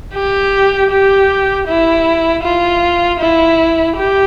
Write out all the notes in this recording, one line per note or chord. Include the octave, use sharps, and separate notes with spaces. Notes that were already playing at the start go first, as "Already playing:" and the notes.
G4
G4
E4
F4
E4
G4